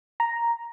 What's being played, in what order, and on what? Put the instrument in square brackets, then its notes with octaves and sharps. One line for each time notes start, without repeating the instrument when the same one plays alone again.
[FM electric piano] A#5